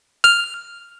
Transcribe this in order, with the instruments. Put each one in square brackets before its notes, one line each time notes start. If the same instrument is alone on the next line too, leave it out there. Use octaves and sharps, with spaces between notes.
[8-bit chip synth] F6